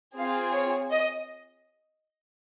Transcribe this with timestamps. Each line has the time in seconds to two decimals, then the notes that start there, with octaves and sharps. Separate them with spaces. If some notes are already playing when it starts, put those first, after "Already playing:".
0.18 C4 F4 G#4 F5
0.54 C#5
0.91 D#5